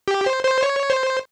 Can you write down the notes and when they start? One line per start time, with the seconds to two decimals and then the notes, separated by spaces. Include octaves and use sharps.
0.08 G4
0.26 C5
0.44 C5
0.63 C#5
0.90 C5